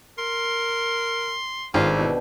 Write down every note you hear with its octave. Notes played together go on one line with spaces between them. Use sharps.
A#4 C6
G#1 B3 D4 F4 G4
B2 E3 G5